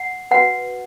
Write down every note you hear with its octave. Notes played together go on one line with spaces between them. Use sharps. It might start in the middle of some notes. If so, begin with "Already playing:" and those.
Already playing: F#5
F#4 B4 F#5